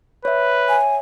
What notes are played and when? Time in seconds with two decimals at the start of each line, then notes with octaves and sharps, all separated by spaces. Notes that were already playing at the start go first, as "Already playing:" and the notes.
0.25 B4 C#5 E5
0.69 G#5